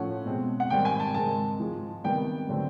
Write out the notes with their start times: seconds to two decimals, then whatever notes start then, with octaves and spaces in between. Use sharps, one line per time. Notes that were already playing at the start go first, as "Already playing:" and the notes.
Already playing: A2 F3 A3 C#4 F#5
0.26 B2 G#3 C4
0.60 F#5
0.70 G#2 D#3 G3 C4 G5
0.85 G#5
1.00 A5
1.14 G#2 D#3 G#3 C4 A5
1.60 G#2 F3 G#3
2.04 C3 D#3 G3 B3 G5
2.49 D3 F#3 A3 C4